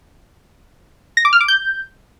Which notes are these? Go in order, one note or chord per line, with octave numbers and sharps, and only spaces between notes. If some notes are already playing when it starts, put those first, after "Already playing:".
A#6
D6
F6
D6
G6